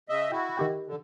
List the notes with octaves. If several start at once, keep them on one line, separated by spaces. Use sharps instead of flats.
C#3 D#5 E5
E4 F#4 G5
D#3 G4 G5
D3